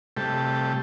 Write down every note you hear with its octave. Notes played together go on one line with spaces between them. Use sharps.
C3 G3 A3 G4 A4